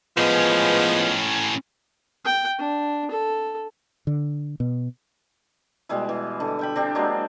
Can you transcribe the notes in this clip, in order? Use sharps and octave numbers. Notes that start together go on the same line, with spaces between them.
A2 F3 G#3 B3 C#4
G5
D4
A4
D3
B2
B2 G3 G#3 E4
E3
D3
E5 G5 B5
C4 D4 G4
F#3 G#3 A#3 D4